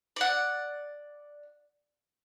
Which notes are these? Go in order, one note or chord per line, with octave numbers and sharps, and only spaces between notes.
D5 F#5